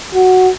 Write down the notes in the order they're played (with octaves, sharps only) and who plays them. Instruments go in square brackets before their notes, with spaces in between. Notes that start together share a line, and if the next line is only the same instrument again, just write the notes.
[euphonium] F#4